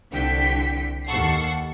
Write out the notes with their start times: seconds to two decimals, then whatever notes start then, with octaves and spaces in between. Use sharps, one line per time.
0.12 C2 D3 G5 B6
1.07 D#2 A4 F#5 C#6 C7